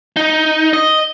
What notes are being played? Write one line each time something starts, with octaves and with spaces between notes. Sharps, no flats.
D#4
D#5